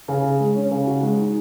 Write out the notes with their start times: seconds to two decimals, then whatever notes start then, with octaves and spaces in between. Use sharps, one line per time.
0.08 C#3
0.25 G#4
0.40 G#3
0.55 C#4
0.71 C#3
0.87 F#4
1.03 G#3
1.19 D#4